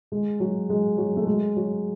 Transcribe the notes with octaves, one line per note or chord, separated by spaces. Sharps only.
G#3
F#3
G#3
F#3
A3
G#3
F#3